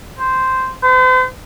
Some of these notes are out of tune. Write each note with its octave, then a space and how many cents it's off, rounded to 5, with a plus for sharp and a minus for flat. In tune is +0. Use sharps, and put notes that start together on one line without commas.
C5 -5
C5 -45